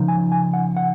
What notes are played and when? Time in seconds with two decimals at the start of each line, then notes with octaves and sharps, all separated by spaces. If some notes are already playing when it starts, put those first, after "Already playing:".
Already playing: C#3 F3 D#4
0.08 G#5
0.32 G#5
0.53 F#5
0.77 F#5